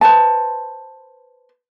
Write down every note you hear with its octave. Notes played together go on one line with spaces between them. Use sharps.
B4 C5 A5